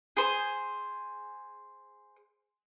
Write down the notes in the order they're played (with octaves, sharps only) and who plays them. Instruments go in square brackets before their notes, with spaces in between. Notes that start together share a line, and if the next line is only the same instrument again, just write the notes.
[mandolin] G#4 C5